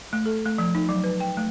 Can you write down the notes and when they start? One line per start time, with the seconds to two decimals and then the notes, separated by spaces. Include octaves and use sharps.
0.13 A3
0.26 A4
0.46 A3
0.58 F3
0.75 D#4
0.89 F#3
1.04 B4
1.20 G5
1.37 A3